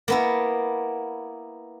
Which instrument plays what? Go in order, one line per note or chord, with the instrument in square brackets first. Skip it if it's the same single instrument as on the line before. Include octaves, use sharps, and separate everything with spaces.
[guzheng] A#3 B3 E4